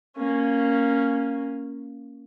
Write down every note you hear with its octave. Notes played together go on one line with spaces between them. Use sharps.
A#3 C#4